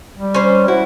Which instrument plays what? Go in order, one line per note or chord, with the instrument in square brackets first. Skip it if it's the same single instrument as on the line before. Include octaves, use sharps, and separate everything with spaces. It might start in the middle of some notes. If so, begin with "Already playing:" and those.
[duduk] G3
[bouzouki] C#4 C5
[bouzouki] E4 [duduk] F#4